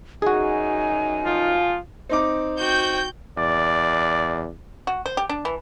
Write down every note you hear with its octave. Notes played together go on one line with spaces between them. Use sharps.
F#2 D#4 F#4 G#4 G#5
F3 F4
C4 D#4 D6
F#4 G5 G6
E2 D5
F#4
C5
G4
D4
E3